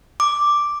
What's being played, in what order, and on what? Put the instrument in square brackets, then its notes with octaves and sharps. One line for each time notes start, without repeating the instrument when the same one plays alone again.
[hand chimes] D6